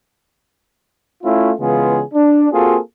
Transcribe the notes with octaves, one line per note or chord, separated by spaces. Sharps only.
A3 C#4 E4 F4
C#3 E3 G#3 B3 F4 G#4
D4
A#3 C4 F4 F#4 G#4 A4